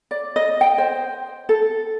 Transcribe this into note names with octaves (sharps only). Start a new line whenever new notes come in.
D5
D#5
G5
C5
A4